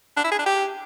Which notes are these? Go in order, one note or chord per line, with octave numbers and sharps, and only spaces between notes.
D4
E4
G#4
D4
G4